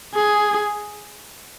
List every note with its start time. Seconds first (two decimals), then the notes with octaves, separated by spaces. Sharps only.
0.15 G#4